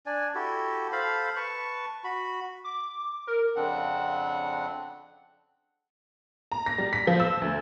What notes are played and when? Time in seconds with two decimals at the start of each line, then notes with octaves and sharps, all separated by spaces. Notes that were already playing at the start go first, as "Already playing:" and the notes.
0.06 D4 D5 G#5
0.35 E4 F#4 G4 A4
0.92 A4 C5 F5 B5
1.36 B4 A5 C#6
2.04 F#4 B5
2.64 D6
3.27 A#4
3.56 F2 C#3 C4 D4 F#5
6.52 A#5
6.66 A#6
6.78 G3
6.93 B6
7.07 F3
7.20 E6
7.41 D2